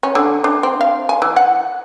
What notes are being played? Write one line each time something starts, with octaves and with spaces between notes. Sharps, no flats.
C#4
D3
D4
C4
F5
G#5
E3
F#5